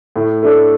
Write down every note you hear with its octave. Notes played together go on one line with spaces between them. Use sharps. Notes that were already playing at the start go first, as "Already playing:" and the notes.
A2
A3 D4 A4